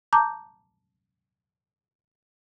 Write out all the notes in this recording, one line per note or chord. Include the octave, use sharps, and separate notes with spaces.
A5 A#5 D6 G6